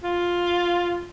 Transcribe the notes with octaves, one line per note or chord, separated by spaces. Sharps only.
F4